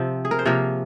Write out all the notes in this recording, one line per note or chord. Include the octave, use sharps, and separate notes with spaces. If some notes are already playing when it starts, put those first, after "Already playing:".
Already playing: C3 F3 C4
G#4
A#4
C5
C3 F3 A#3 A#4 C#5